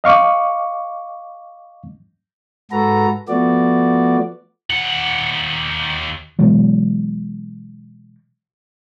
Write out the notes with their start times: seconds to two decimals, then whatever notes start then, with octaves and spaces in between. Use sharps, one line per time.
0.04 D#5 F5 C#6 D6
2.71 G#2 F#4 A4 B4 A#5
3.28 F3 A3 B3 F#4 D5
4.70 D#2 F#5
6.39 B2 E3 F#3 G#3